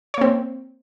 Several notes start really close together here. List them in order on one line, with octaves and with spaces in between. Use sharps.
C#5 A#3 C4